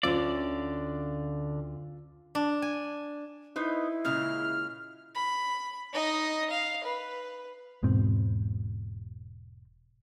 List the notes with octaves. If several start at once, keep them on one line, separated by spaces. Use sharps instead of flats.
D2 D3 C#4 F4 D5 E6
D4
G#5
D#4 E4 B4 C5
A#2 C#3 G#3 F6
B5
D#4 D#5
F5
B4
E1 G#2 B2 C4